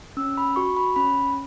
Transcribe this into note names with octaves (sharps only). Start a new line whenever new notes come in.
C#4 E6
B5
F#4 C#6
B5
C#4 B5